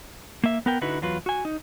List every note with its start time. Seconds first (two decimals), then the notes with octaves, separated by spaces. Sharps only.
0.44 A#3 E5
0.66 B3 A#4 G5
0.81 D3 D#4 E4 F#4 B4
1.01 E2 F#3 F4 B4
1.26 F#4 G#5
1.45 D#4